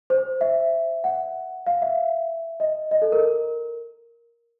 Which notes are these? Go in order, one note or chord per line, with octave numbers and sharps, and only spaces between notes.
C5
E5
F#5
F5
E5
D#5
D#5
A4
A#4